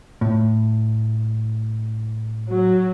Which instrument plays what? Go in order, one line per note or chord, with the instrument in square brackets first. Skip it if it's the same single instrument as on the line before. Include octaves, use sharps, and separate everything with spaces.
[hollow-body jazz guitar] A2
[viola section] F#3